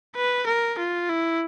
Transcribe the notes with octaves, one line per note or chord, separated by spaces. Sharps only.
B4
A#4
F4
E4